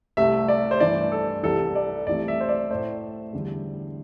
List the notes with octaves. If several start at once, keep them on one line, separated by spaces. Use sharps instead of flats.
C2 C3 A3 E5
D5
C5
G2 E3 A3 D5
A4
C2 C3 E3 A4
D5
C2 C3 E3 A3 D5
E5
C5
D5
A2 A3 C5
E2 D3 G3